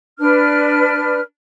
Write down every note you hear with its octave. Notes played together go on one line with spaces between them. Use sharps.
D4 B4 F6